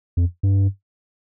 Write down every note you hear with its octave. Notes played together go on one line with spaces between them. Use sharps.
F2
G2